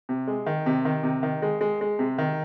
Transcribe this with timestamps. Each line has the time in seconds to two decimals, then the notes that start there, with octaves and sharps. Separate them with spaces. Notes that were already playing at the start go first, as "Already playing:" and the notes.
0.09 C3
0.27 G#3
0.46 D#3
0.66 C3
0.85 D#3
1.03 C3
1.23 D#3
1.42 G#3
1.61 G#3
1.81 G#3
1.99 C3
2.18 D#3